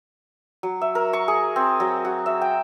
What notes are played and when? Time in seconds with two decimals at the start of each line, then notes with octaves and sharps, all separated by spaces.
0.63 F#3
0.81 E5
0.95 A#4
1.13 C#6
1.28 G#4
1.56 C4
1.80 F#3
2.05 F#4
2.26 E5
2.41 G5